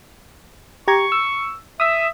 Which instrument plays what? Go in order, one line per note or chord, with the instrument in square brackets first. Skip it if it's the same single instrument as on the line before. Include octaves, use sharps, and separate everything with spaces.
[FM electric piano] G4 A#5 G#6 [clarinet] C#6
[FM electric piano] E6
[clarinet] E5 [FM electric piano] D#6 E6